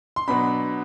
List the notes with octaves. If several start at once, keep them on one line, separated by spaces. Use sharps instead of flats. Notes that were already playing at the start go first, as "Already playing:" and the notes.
C6
B2 F#3 B3 D4 B5